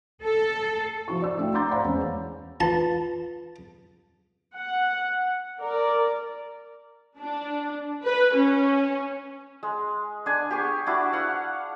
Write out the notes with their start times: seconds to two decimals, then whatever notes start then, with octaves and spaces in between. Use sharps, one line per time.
0.24 A4
1.08 F3 E4 F#4 C#6
1.22 D5 E6
1.38 A3 D4 F#4 F5 G5
1.54 A#5 C6 D6 G6 A6
1.71 C5 D5 F5 F#5 A#5 B5
1.84 E2 G#3 C#4
2.60 F4 B4 A5
4.54 F#5
5.59 A#4 D5
7.19 D4
8.04 B4
8.35 C#4
9.63 G#3
10.26 D4 G#5
10.51 G4 G#4 G#5 C#6
10.87 D4 E4 F#4
11.13 F5 F#5